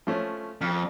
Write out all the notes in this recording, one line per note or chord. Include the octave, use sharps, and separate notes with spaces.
F3 A3 C#4
F2 F6